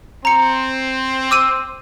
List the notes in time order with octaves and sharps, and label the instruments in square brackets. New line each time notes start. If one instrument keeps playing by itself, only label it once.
[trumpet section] C4 [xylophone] A#5 C#7
[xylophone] D6 E6 D#7